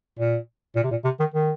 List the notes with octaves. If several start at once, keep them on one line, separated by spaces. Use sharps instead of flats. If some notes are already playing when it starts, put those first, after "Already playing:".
A#2
A#2
C3
A#2
C3
D#3
D#3